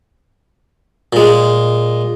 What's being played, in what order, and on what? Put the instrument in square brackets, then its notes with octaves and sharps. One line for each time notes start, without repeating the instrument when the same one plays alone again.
[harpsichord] A#2 G#3